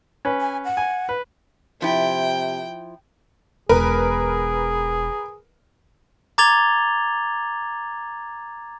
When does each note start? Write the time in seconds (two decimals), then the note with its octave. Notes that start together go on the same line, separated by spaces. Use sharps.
0.25 C#4 B4
0.41 G#5
0.65 F#5
0.77 G#5
1.09 B4
1.82 C3 F3 E4 G5
3.69 E1 G#4 A#4 B4
6.38 A#5 D6 G#6 A6 F7 G7